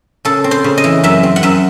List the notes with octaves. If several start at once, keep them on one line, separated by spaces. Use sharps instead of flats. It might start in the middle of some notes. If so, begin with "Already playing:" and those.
C#3 A4
C4
C5
C#3
D#5
E3
F#2 E5
C4
F#5
F#2 E5